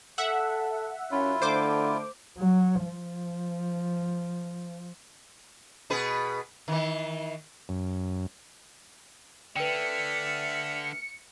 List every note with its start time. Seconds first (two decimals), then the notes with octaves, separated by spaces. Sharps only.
0.18 A4 E5 F#5
1.11 F#2 C#4 E4 F4
1.42 D3 A3 C5 D6
2.38 F#3
2.86 F3
5.90 B2 G#4 B4
6.68 D#3 E3
7.69 F#2
9.56 D3 A3 B4 E5 G5 F6 C#7